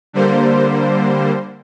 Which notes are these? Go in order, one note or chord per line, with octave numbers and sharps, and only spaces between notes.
D3 G3 A#3 C5